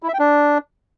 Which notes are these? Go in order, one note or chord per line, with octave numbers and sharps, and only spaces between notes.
E4
E5
G5
D4